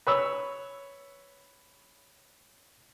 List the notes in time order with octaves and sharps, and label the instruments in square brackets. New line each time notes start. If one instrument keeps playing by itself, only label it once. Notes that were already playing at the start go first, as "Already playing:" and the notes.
[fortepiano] B4 C#5 E6